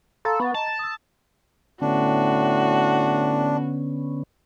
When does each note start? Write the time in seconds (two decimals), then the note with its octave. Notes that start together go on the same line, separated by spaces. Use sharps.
0.25 A4 F5 A#5 C6
0.40 B3 C#6 A6
0.54 D#5 A5 A#5
0.67 A6
0.79 D#6 E6
1.82 A2 D3 B3 C#4 D4 F#4